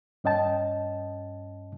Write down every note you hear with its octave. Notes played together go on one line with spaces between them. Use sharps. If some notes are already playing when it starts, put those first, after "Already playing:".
G2 C#4 D#5 G5 A5